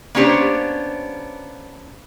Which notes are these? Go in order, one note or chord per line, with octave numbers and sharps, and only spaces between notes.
A#3 B3 C#4 D4 G4 C5